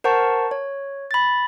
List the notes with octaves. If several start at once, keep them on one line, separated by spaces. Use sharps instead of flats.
A#4 C5 F#5 A5 C#6
C#5
B5 A6